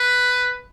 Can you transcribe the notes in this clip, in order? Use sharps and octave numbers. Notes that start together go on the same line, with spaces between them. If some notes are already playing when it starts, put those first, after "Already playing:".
Already playing: B4